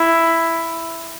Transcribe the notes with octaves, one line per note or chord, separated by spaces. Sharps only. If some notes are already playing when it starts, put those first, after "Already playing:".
Already playing: E4